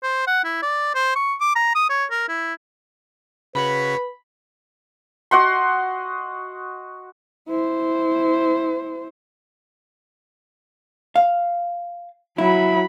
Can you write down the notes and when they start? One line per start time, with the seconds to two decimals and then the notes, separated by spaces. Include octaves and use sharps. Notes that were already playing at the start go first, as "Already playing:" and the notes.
0.03 C5
0.27 F#5
0.44 E4
0.62 D5
0.95 C5
1.15 C#6
1.40 D6
1.55 A#5
1.75 D#6
1.89 C#5
2.11 A#4
2.28 E4
3.55 C#3 F#4 B4 C#5 B5
5.31 F#4 D#5 F#5 C6
7.48 E4 C5
11.16 F5
12.38 F#3 E4 B5